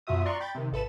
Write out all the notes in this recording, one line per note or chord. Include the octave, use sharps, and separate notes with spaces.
F#2 B2 F4 F#4 E5 D#6
D5 A#5 C6 C#6 F#6
G5 B5 G6 A6
C3 D#3
G#1 A4 B4 E7